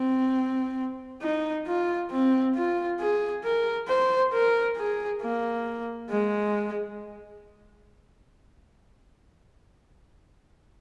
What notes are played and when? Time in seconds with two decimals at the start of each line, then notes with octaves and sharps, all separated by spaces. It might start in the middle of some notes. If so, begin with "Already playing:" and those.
Already playing: C4
1.22 D#4
1.67 F4
2.11 C4
2.56 F4
3.00 G#4
3.44 A#4
3.88 C5
4.33 A#4
4.77 G#4
5.21 A#3
6.10 G#3